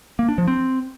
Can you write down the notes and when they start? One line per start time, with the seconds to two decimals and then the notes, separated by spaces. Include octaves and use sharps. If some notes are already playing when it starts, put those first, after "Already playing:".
0.19 A#3
0.28 D4
0.38 F3
0.48 C4